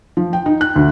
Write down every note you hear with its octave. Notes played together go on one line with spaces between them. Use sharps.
F3
G5
D#4
F#6
D2